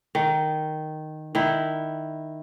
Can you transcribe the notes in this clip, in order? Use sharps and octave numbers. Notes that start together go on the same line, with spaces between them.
D#3
D#3 E4